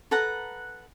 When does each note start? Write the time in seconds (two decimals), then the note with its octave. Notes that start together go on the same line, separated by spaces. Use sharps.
0.11 A4 B4 F#5 A#5